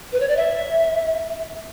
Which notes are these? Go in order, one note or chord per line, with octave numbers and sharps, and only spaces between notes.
B4
C#5
D5
E5